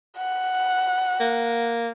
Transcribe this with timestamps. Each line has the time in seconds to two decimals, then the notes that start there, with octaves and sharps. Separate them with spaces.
0.18 F#5
1.20 A#3